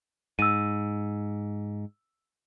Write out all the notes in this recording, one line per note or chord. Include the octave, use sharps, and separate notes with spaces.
G#2 E6 D#7